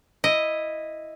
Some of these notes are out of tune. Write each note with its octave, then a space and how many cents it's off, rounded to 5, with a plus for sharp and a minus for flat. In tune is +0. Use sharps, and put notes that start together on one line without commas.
E4 +0 D#5 +0